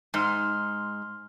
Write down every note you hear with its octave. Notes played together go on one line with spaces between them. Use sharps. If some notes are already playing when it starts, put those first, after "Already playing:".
G#2 C6 F6